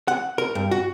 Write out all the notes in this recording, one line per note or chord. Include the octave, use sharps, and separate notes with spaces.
F#5
A#4
G2
F#4